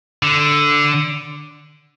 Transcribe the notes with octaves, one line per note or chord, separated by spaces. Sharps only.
D3